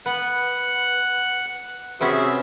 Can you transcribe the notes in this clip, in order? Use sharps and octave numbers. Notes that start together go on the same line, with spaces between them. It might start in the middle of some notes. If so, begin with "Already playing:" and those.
B3 F#5 F#6
C3 B3 C#4 F#4 G#4 E5